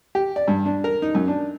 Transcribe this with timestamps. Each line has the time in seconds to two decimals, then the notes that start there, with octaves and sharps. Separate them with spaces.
0.15 G4
0.36 D5
0.48 G2
0.66 D4
0.84 A#4
1.02 D#4
1.15 F#2
1.28 D4